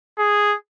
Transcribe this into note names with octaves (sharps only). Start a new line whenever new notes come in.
G#4